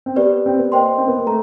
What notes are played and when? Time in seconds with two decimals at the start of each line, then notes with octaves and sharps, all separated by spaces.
0.06 C4
0.16 B3 G4 B4 D5
0.46 C4
0.59 B3
0.72 A#3 C5 D#5 G5 C6
0.98 C4
1.08 B3
1.18 A#3
1.27 A3 A#5